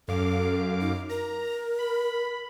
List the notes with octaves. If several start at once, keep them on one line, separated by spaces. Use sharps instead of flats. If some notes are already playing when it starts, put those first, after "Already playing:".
F#2 A4 F5 D6
D#4
A#4 A#5
B5